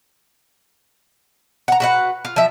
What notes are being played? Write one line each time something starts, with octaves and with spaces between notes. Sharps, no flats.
F#5 A#5
F#4 B4 F#5
F4
F3 E5